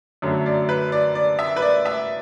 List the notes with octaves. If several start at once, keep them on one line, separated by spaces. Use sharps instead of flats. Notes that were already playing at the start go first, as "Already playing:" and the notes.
F#2 D3 F#3 A3
D5
B4
D5
D5
E5
B4
D5
E5